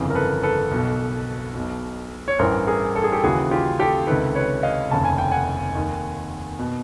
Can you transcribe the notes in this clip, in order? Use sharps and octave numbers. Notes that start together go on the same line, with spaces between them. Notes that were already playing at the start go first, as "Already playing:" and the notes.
Already playing: G1 F2 C#3 E3
A#4
A4 B4
A4 B4
B1 B2
B1 B2
C#5
A1 G2 E3 A#4 C5
G#4 A#4
A4
G#4
G4 A4
D#2 C#3 E3 F#4 G#4
F4 G4
G4 A4
C#2 C3 D#3 A4 B4
B4 C#5
D#5 F5
F1 D#2 C#3 A5
G#5
G5
F#5 G#5
D#2 D#3
B2